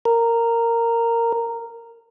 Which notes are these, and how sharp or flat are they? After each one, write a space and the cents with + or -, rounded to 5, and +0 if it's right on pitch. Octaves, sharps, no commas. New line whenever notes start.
A#4 -10